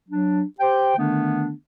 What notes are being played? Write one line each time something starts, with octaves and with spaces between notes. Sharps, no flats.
F#3 D4
G4 C5 G5
D3 D#3 A3 B3 D4